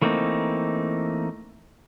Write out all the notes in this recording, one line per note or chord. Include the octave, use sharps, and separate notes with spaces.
E3 A3 A#3 C4 D#4